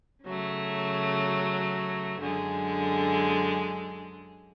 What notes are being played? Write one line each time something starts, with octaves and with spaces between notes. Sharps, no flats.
C#3 F#3 A3
F#2 D3 G#3